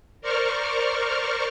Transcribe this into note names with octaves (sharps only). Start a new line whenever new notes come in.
A#4 C5 D5 C#6 F6